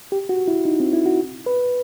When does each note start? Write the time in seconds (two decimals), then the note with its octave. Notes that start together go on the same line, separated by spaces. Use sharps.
0.12 G4
0.29 F#4
0.48 E4
0.65 D#4
0.80 C4
0.93 E4
1.06 F#4
1.46 B4